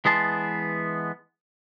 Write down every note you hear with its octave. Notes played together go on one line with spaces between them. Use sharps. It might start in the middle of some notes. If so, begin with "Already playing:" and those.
E3 G#3 B3 G#4 A5 C6